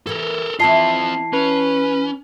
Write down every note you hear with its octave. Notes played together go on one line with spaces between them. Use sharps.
E3 A#3 A4 A#4
E3 C4 E4 F4 D#5 A5 C7
C#4 B4